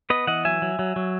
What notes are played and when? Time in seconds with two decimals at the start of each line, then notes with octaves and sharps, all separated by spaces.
0.10 B3 B4 D#5
0.27 E3 D#5 F#5
0.45 F#3 E5 G#5
0.62 F#3
0.79 F#3
0.96 F#3